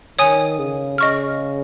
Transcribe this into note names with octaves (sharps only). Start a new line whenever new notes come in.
D#3 C#5 G#5 D#6
C#3
C#3 D#5 C#6 F6